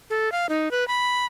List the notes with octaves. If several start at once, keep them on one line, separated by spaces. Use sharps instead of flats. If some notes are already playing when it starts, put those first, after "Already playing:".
A4
F5
D#4
B4
B5